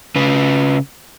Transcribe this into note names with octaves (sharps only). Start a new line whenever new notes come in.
C#3 B4